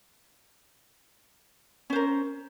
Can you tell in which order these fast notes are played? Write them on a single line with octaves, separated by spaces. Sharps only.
C#4 C5 A#4